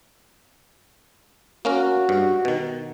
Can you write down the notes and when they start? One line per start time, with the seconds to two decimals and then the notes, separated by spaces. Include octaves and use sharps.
1.65 A#3 C#4 F#4 A#4
2.09 G2
2.45 B2 D#3